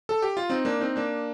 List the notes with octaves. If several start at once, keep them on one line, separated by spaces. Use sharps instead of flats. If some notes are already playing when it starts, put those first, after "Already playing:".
A4
G4
F4
C4 D#4
A#3 D4
C4 D#4
A#3 D4